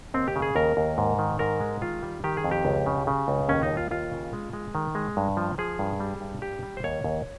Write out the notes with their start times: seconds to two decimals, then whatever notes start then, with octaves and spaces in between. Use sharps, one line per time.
0.14 D#2 C4
0.28 G4
0.36 C#3
0.42 G#4
0.56 D#2 A#4
0.77 D#2
0.98 G#2
1.19 D#3
1.39 G#2 A#4
1.60 G#3
1.82 D#3 F4
2.03 G3
2.24 D#3 G4
2.37 G#4
2.44 F2
2.51 G4
2.65 C#2
2.86 C#3
3.07 C#3
3.28 C#2
3.49 D#2 C#4
3.63 D#4
3.70 G3
3.77 F4
3.91 D#2 F4
4.12 C#3
4.33 G#3
4.53 G#3
4.75 D#3
4.95 G#3
5.17 G2
5.37 F3
5.58 F3 G#4
5.79 G2
6.00 G3
6.21 G2
6.42 G3 G4
6.63 G3
6.77 C5
6.84 D#2 C#5
7.04 D#2